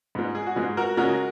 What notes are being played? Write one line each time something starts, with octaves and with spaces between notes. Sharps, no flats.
G#2 G#3
G#4
F#4
G#2 G#3 G#4
F#4 A#4
C#3 G#3 F#4 A#4